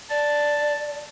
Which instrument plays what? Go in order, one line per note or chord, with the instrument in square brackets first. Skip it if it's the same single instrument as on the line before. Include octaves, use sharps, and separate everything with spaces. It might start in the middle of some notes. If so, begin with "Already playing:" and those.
[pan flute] D5 [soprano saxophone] A5